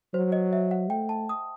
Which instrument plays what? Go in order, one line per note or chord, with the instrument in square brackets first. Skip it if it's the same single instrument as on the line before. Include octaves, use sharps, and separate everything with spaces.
[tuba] F#3 [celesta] C5
[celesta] D#5
E5
F#5
[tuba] A3 [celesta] G5
[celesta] A5
D#6